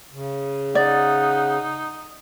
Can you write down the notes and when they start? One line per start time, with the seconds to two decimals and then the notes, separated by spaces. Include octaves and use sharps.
0.12 C#3
0.75 D#4 D5 F#5